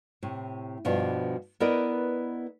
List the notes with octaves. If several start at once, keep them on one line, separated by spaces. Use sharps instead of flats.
A2 C3
G2 B2 F3 B3 D4
B3 E4 A#4 B4 D5 D#5